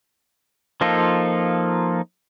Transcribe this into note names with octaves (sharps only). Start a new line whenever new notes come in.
F3 A#3 D#4 F4 A4